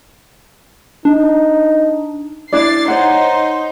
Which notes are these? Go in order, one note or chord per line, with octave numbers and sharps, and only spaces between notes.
D4 D#4
D4 E4 D5 A6 C7
D#4 C5 C#5 F#5